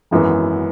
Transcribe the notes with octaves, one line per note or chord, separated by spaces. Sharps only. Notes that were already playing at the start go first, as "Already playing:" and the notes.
G#1 F#2 E3 B3